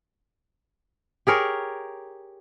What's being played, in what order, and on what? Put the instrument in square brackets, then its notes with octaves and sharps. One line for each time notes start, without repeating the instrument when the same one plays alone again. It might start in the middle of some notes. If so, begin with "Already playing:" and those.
[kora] G4 G#4 A#4 C#5